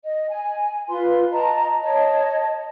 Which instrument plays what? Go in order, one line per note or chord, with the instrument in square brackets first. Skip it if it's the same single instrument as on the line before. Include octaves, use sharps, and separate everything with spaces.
[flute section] D#5
G#5
F4 B4 C6
D#5 A5 A#5
C#5 D#5 A5